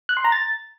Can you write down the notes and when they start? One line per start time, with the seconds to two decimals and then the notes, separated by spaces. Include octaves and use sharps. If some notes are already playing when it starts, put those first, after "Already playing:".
0.09 F#6
0.17 C6
0.25 A#5
0.32 A6